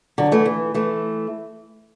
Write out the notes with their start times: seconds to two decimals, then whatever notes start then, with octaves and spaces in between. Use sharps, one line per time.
0.18 D3 F#3
0.32 E3 A3
0.46 E3
0.74 E3 A3